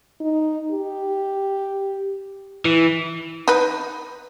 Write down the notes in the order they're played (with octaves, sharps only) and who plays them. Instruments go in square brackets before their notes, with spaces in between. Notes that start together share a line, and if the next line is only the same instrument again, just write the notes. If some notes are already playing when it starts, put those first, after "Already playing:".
[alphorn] D#4
G4
[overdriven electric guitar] E3
[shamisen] D#4 B4